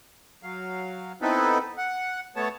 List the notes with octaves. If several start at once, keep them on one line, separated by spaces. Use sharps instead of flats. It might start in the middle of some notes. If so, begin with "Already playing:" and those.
F#3 F5
B3 C4 D#4 E4 A4 B4
F#5
A3 B3 C#5 A5